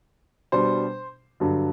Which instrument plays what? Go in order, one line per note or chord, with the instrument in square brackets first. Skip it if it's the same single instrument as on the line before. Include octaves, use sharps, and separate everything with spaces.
[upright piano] B2 G3 D4 [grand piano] C5
[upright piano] G2 D3 F#3